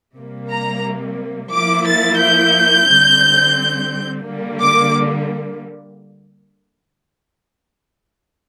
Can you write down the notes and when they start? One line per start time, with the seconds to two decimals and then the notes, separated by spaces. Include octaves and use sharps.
0.15 C3 G3 A#3
0.50 A#5
1.52 F3 A#3 E4 D6
1.86 A6
2.21 G6
2.89 D3 G3 C4
4.25 D3 G3 A#3
4.60 D6